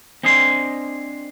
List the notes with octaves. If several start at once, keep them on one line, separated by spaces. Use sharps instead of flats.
C4 D4 D#5 G#5 C6